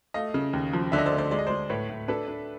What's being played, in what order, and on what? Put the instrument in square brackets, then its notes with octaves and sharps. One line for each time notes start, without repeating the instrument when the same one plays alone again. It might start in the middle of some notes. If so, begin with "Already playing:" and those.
[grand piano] A3 D#5 F5
C#3
D#2
F3
D3 D5 E5
D#5
C5 D5
D2
C5 D5
G#3 D5
D#5
G#3 C5 D5
A2 B4 C#5
A2
D4 A4 B4
D4